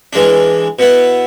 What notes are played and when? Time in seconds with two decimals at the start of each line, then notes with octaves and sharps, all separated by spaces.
0.13 E3 G#3 D4
0.79 B2 B3 E4